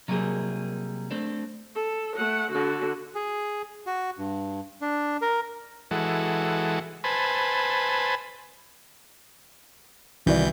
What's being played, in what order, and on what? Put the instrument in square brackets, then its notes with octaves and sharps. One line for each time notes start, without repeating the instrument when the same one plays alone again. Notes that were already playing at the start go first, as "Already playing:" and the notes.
[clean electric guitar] C3 F#3 G3 A#3 G#4
A3 C4 D4
[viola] A4
A3 F#5
D3 F#4
[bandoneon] G#4
F#4
G2
D4
A#4
[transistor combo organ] E3 G#3 F#4 A4
B4 C5 G#5 A5 B5
[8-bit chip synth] C2 E3 G6 [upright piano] D#3 F#4 D5